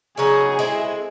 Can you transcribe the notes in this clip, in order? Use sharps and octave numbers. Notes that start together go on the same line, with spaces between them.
C#3 F#3 B3 D#4 G#4
G#3 C4 E4 A4